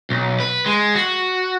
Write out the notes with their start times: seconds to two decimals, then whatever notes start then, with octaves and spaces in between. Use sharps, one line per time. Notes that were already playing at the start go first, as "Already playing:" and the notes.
0.10 B1
0.40 B4
0.66 G#3
0.95 F#4